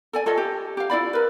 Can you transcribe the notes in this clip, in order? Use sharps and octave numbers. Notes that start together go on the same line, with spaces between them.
A4 D5 G#5
F4 A4 C#5 D#5
G4
G4 F5
E4 F4 D5 B5
A#4 B4